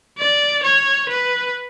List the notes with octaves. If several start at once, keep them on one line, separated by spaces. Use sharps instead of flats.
D5
C#5
B4